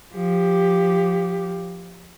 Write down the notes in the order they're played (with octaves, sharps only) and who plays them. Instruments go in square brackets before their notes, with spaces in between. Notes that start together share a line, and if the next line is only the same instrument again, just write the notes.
[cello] F3 G4